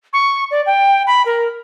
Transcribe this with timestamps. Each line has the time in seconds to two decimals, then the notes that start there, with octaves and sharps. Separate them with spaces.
0.13 C#6
0.51 D5
0.66 G5
1.07 B5
1.26 A#4